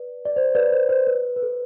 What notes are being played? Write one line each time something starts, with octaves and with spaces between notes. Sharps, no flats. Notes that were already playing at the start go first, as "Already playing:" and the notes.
Already playing: B4 D5
D5
C5
B4 D5
C5
C5
B4
B4
A4